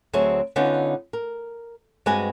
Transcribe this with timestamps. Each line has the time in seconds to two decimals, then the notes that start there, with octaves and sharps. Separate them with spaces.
0.13 D2 F#3 C4 G#4 C#5 E5
0.56 D3 B3 C#4 D#4 F4
1.13 A#4
2.06 G2 G#3 C4 F#4 B4 G#5